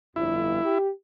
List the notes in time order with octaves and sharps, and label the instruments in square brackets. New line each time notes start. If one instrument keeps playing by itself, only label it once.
[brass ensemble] G1 F2 [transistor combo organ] E4
[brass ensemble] G4